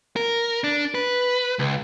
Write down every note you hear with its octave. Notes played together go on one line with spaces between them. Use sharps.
A#4
D4
B4
C#2